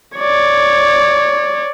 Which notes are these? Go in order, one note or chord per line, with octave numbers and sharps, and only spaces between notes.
C#5 D5